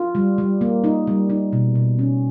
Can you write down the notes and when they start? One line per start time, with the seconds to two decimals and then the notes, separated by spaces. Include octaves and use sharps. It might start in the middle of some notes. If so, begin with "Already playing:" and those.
Already playing: F4
0.15 G3
0.38 G3
0.61 A#3
0.84 D#4
1.07 G3
1.30 D#4
1.53 B2
1.75 B2
1.99 C#4